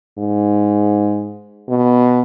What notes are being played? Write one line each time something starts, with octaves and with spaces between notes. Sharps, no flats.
G#2
B2